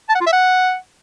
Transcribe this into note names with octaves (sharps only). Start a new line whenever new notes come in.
A5
F#5
F4
E5
F#5